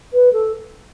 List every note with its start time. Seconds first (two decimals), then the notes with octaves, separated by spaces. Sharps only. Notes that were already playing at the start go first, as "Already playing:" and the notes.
0.13 B4
0.33 A4